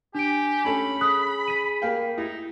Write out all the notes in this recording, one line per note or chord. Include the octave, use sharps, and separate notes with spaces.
D4 G4 G#5 D7
C#4 A4 B5
G#4 D#6 F#6
B6 D#7
A#3 F5 G5
D#4 E4